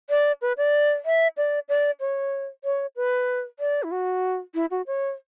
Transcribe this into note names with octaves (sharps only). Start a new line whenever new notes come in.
D5
B4
D5
E5
D5
D5
C#5
C#5
B4
D5
E4
F#4
E4
F#4
C#5